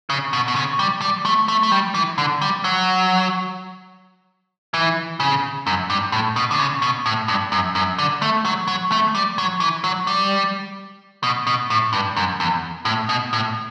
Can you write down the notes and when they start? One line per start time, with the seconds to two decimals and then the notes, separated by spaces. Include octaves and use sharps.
0.10 C#3
0.33 B2
0.48 B2
0.56 C#3
0.79 G3
1.01 G3
1.25 A3
1.48 A3
1.63 A3
1.72 G3
1.94 E3
2.18 D3
2.41 G3
2.64 F#3
4.74 E3
5.20 C#3
5.67 F#2
5.90 G2
6.12 A2
6.36 B2
6.51 D3
6.59 C#3
6.82 B2
7.06 A2
7.28 G2
7.52 F#2
7.75 F#2
7.99 D3
8.22 A3
8.45 F#3
8.67 F#3
8.92 A3
9.15 G3
9.38 F#3
9.60 E3
9.84 F#3
10.07 G3
11.23 B2
11.47 B2
11.70 A2
11.93 G2
12.17 F#2
12.40 E2
12.85 A2
13.09 B2
13.33 A2